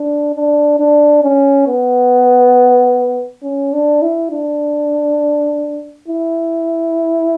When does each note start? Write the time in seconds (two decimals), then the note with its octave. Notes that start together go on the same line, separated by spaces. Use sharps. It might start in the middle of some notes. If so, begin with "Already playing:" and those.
Already playing: D4
0.35 D4
0.79 D4
1.23 C#4
1.67 B3
3.43 C#4
3.73 D4
4.02 E4
4.31 D4
6.08 E4